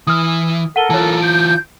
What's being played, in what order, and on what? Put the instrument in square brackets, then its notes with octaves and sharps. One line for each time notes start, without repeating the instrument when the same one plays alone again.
[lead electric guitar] E3 [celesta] D#6 F6
[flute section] A4 A#4 [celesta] F#5 D#7 G7
[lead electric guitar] E3 F4 [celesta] C#5 A5
[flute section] G6 [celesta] D7